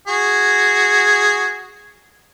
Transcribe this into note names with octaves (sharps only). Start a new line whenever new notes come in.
F#4 G#4